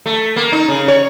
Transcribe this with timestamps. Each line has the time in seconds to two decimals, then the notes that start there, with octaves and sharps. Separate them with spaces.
0.06 A3
0.36 A#3
0.52 D#4
0.68 C#3
0.88 C#5